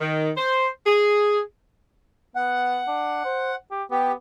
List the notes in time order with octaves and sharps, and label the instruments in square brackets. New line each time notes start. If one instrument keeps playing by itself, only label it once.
[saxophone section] D#3
C5
G#4
[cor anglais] B3 [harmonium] F#5
[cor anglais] D4
C5
G4
[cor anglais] B3 [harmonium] G4